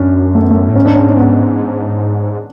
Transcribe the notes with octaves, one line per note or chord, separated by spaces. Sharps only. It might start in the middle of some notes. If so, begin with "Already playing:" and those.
Already playing: F#2 C#4 D4
A3
B3
A3
A2
G#2 C#4
D4
C#4
C#4
B3